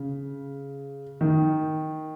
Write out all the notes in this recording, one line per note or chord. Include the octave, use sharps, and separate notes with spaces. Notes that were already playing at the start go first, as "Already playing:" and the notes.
Already playing: C#3
D#3